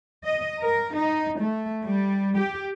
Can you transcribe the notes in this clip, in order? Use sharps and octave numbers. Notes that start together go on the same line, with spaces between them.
D#5
A#4
D#4
A3
G3
G4